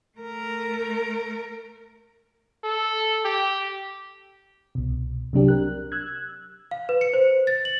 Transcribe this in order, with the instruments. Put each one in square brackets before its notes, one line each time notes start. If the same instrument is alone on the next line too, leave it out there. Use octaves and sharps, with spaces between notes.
[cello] A3 A#4
[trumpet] A4
G4
[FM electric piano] C2 B2
C3 F#3 D4 G4
A#4 F#6
E6 F#6 G#6
[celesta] F5
B4
C#7
C5
A6
F#7